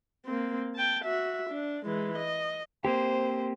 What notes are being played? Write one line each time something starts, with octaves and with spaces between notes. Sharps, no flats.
A#3 C4
G5 A5
F#4 E5
D4
E3 G#3
D#5
A#3 C4 G4 C5